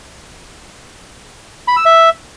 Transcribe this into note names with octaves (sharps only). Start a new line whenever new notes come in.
B5
E6
E5